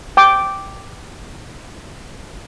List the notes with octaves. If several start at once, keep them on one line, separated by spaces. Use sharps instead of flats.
G5 D6